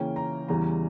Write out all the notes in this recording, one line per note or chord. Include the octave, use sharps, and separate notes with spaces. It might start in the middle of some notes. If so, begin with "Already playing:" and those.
Already playing: C#3 E3 A#3 C#4 G5
A#5
E2 C#3 E3 G3 A#5